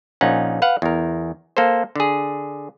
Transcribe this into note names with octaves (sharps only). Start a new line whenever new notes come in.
A#1 C#4 D#4 F4 F#5
B4 F5 F#5
E2 A#4
A#3 A4 C5
D3 G#4